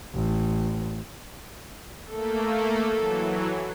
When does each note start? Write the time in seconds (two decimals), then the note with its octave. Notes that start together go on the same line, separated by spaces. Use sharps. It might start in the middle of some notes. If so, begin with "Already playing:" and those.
0.14 A1
2.11 A3 A#3 A4
2.93 E3 F#3